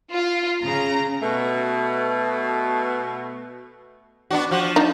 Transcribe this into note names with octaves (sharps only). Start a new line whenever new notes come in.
F4
C#3 A#5
B2 A3
B3 D4 F#4
F3 F#4
D4 D#4